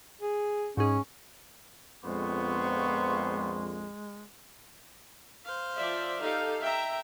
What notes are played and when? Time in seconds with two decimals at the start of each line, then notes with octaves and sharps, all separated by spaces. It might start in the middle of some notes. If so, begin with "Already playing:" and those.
0.21 G#4
0.77 G#2 C#4 D#4 G#4
2.05 A#1 F2 G#3 B3 C5 C6 C#6
5.45 C5 F5
5.77 F3 D5 E5
6.21 D#4 G4 A4 F5
6.62 E5 G5 A#5